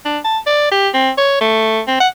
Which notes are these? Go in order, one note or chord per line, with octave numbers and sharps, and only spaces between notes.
D4
A5
D5
G4
C4
C#5
A3
C4
F#5